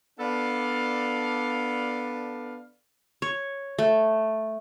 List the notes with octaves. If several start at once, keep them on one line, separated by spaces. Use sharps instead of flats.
B3 D4 A4 D5 F5
C#5
A3